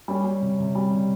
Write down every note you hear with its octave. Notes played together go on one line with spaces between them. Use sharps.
G3 C#4
G3
C3
C3
G3
C3